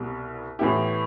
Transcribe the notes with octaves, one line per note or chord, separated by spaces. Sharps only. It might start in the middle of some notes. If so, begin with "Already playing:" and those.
Already playing: C2 B2 G3
A2 E3 B3 E4 G4